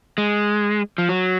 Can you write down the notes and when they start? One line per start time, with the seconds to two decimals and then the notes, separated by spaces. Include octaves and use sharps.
0.18 G#3
0.98 F3
1.09 F#3